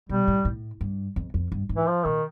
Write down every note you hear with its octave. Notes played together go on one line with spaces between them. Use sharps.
B2 G3
A2
A2
G2
F2
F2
G2
G#2
E3
F3
A#2 D#3